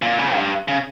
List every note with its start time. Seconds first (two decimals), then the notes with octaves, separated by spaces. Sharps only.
0.02 A#2
0.19 C#3
0.35 G2
0.68 C#3